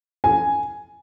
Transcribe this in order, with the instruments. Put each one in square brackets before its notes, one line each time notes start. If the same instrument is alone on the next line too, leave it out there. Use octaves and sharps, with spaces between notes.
[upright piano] G#5